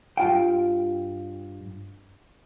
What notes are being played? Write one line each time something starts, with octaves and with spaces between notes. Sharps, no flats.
G2 F4 G5